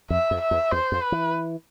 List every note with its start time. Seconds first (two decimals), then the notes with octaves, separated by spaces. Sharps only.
0.10 F2 E5
0.31 F2
0.41 E5
0.51 E2
0.72 E2 C5
0.92 F2
1.02 B4
1.12 E3